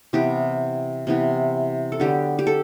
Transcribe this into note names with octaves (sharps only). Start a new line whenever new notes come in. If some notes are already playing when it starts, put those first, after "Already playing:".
C3 E3 B3 G4
C3 E3 B3
A4
D3 F#3 B3 G4
G4
A4